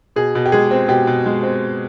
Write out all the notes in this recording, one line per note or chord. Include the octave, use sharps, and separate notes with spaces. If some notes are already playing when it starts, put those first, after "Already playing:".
B2 G#4
B2
G4
G#3 G#4
C4
B2 G4
B2
G#3
C4